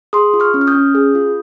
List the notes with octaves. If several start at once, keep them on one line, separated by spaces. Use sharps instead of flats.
G#4 C6 D#6
F4
C#6 F6
C#4
F6
D#6 G6
C#4
G#4
F4